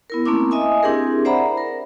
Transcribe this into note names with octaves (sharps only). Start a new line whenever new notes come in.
B3 E4 A#4
A3 A#3 C4 C#4 E4 D6
D#5 E5 G#5 D#6
C4 D4 E4 G4 G#4 A#4
C5 D5 E5 F#5 A#5 B5
A#4